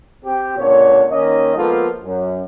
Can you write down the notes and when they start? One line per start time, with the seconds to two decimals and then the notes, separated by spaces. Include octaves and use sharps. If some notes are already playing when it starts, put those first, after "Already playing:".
0.25 C4 G4
0.58 C#2 A#2 D3 C#5
1.10 D#3 A#3 C#4 D#5
1.56 F3 G#3 A#3 B3 F4 A4
2.02 F#2